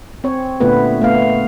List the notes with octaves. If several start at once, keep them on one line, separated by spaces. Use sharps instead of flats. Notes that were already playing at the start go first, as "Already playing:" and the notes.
C4 C#5
A#2 D3 A3 B3 B4
A3 B3 F5